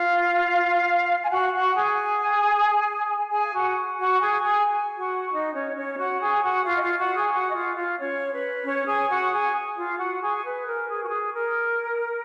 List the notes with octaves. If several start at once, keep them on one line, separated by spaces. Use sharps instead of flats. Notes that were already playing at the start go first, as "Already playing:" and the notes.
Already playing: F4 F5
G#5
F#4 F#5
F#4 F#5
G#4 G#5
G#4 G#5
F5
F#4 F#5
F#4 F#5
G#4 G#5
G#4 G#5
F#4 F#5
D#4 D#5
C#4 C#5
C#4 C#5
F#4 F#5
G#4 G#5
F#4 F#5
F4 F5
D#5
F4 F5
F#4 F#5
G#4 G#5
F#4 F#5
D#5
F4 F5
F4 F5
C#4 C#5
B4
C#4 C#5
G#4 G#5
F#4 F#5
G#4 G#5
F4 F5
F#4 F#5
G#4 G#5
B4
A#4
G#4
F#4
G#4
A#4